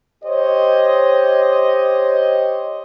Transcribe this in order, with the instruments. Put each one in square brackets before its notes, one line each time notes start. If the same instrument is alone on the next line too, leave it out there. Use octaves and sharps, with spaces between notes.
[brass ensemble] G4 C5 C#5 D#5